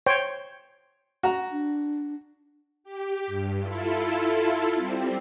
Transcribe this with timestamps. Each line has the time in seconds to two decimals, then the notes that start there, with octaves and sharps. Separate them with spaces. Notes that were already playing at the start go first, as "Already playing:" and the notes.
0.06 C5 C#5 G5
1.23 F#4 A#5
1.51 D4
2.84 G4
3.27 G2
3.61 E4 F4 A4
4.75 G3 C4